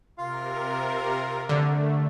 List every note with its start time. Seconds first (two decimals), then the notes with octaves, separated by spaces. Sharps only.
0.18 C3 F4 A#4 F5
1.49 D3 A3